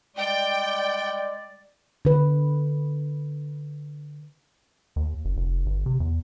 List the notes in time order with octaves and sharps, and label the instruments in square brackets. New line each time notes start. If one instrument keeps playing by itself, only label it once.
[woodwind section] G3 G#3 D5 [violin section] G5
[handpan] D3 B4
[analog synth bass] D#2
F#1
F1
G1
C3
E2